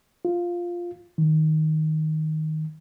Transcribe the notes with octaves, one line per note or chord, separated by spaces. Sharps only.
F4
D#3